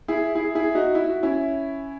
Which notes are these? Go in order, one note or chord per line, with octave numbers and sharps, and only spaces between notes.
E4 G#4
E4 G#4
E4 G#4
D#4 F#4
E4
F#4
C#4 E4